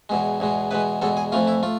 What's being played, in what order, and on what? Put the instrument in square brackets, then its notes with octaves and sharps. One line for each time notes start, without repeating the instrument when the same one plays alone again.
[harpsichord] E2 B2 G#3
E2 B2 G#3
E2 B2 G#3 B4
E2 B2 G#3 A4
G#4
F2 E3 A3 F4
E4
A3 F4